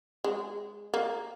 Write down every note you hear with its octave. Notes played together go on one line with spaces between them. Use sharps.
G#3
A#3